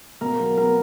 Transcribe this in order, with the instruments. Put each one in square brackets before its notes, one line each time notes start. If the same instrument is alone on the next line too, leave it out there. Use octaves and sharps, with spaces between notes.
[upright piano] B2 [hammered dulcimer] A#4
[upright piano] F#3
[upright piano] B3 [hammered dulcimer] A#4